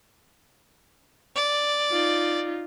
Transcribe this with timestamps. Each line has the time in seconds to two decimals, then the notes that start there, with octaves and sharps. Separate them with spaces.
1.36 D5
1.92 D#4 F4